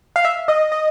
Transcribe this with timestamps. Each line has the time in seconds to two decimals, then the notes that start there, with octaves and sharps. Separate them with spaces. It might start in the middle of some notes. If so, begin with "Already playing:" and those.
0.16 F5
0.25 E5
0.48 D#5
0.72 D#5